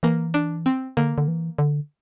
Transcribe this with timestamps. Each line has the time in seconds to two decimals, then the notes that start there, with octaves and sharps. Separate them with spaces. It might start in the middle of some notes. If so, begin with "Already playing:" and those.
0.03 E3 A#3
0.34 D4
0.66 C4
0.97 D3 A#3
1.18 D3
1.28 E3
1.58 D3